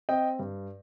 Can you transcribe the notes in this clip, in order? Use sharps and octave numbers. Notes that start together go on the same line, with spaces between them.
C4 D#5 G5
G2